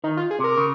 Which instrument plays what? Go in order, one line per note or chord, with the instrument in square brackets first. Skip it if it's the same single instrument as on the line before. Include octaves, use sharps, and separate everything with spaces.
[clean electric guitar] D#3 [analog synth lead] D#4
[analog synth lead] F4
G#4
[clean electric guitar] C3
[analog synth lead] A#4
[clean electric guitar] C#3